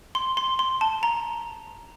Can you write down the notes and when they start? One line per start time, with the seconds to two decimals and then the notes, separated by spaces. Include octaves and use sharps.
0.15 C6
0.37 C6
0.59 C6
0.81 A5
1.03 A#5